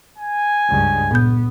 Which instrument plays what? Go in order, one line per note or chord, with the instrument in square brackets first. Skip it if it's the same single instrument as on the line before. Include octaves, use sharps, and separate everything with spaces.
[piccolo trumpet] G#5
[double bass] C#2 G2
[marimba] A#2 G6 [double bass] B3